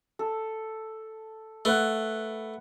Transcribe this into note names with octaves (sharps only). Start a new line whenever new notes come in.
A4
A3 B4 F#5